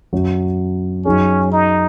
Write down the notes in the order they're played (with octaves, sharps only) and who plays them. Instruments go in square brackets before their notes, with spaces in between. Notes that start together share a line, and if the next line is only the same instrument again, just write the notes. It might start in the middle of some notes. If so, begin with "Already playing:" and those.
[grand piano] F#2 F#3 C#4 F#4
[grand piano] F#2 F#3 D#4 G#4 [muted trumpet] C#4
[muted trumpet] D#4